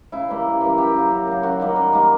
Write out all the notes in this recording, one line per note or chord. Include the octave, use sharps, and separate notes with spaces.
C#3 E4
E3 G3 A#3
C#3
E3 G3 A#3
F#2 G4
C#3 F#3
F#2
C#3 F#3
F#2 F#4
D#3 G3 A#3
F#2
D#3 G3 A#3